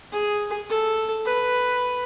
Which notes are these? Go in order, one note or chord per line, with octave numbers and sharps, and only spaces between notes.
G#4
A4
B4